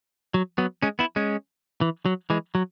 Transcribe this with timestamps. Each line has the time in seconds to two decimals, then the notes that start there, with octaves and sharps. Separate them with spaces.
0.34 F#3
0.58 F#3 B3
0.83 G#3 C#4
0.99 B3 E4
1.16 G#3 C#4
1.81 E3
2.06 F#3
2.30 E3 G#3
2.55 F#3